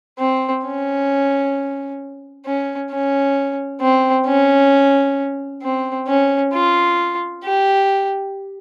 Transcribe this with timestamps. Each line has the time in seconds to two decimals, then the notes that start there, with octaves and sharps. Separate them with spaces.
0.18 C4
0.65 C#4
2.45 C#4
2.91 C#4
3.81 C4
4.26 C#4
5.63 C4
6.07 C#4
6.53 F4
7.44 G4